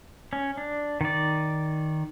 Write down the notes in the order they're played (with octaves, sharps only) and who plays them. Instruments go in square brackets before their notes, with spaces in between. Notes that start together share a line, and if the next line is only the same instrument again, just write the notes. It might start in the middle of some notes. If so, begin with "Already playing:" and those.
[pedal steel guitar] C#4
D4
D#3 D5